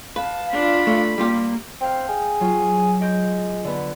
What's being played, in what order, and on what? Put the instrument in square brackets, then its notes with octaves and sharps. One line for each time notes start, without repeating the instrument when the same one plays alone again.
[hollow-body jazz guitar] B4 [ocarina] F5 [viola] A5
[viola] D4 F4 [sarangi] B5
[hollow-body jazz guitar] A3
[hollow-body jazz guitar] G3 F4 G4 [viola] A#3
[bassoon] C4 [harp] F5 G5
[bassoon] G#4
[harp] F#3 F4
[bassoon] G#3 [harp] G6 A#6 D7
[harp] D3 B3